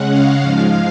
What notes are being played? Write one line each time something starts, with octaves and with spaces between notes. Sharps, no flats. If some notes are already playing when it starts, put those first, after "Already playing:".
Already playing: C#3 G#3 C#4 F#5
F5
G#2 F3 G#3